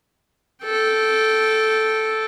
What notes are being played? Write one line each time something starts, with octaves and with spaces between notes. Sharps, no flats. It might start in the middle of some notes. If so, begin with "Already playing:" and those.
A4 G5